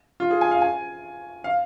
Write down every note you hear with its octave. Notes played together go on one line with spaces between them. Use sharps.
F4
G#4
G#5
F5
G#5
F5